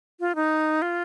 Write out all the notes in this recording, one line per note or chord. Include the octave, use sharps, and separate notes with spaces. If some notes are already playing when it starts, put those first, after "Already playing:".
F4
D#4
F4